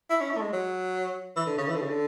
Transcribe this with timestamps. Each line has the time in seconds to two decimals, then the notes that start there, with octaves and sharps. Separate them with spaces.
0.10 E4
0.21 C#4
0.31 E4
0.37 A3
0.41 G#3
0.53 F#3
1.36 E3
1.46 D3
1.58 C#3
1.68 E3
1.75 D3
1.82 C#3
1.89 D3